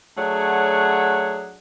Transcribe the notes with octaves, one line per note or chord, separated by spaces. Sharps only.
F#3 A3 D4 G#4 C#5 F#5